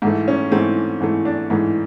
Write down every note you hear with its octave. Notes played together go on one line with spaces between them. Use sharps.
G#2 E3 A3
C#4
G#2 E3 A3 C4
G#2 E3 A3
D4
G#2 E3 A3